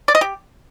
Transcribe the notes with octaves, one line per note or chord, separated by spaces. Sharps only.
D5
D#5
G4